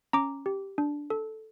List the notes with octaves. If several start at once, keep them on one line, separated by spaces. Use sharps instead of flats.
C#4 A#5 D6
G4
D4
A4